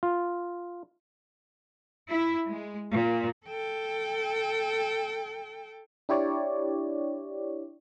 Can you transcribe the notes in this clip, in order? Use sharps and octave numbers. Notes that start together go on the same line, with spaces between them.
F4
E4
G#3
A#2
A4 G5
D4 E4 G4 C#5 D5